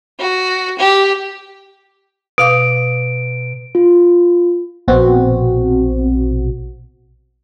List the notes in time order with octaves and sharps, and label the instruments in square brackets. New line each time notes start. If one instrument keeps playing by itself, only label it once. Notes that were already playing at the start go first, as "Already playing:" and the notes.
[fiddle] F#4
G4
[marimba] B2 F5 D6 [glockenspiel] D7
[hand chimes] F4
[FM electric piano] A#1 B2 C4 F#4